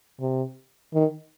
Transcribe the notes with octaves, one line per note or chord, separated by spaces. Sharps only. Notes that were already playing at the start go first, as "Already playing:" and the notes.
C3
D#3